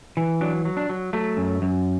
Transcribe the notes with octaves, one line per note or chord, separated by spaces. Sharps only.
E3
F#3 D4
F#3
D4
F#3
F#3 A3
F#2
F#2